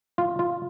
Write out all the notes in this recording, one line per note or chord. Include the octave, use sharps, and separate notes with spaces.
F4
F4